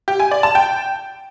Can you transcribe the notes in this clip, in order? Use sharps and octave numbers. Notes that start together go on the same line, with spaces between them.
G4
G#5
D5
A5
G5